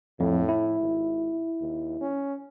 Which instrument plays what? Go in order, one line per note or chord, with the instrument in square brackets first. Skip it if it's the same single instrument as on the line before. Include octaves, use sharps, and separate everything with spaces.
[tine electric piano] F2 [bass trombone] A2
[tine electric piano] E4
[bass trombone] G#1
D#2
C#4